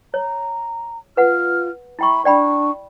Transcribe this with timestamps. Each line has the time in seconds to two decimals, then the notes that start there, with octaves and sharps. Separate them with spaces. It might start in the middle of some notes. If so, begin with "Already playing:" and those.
0.14 C#5 A#5
1.17 F4 B4 F#5 F6
1.99 E4 E5 G5 B5 C#6
2.25 D4 D5 G5 B5 C#6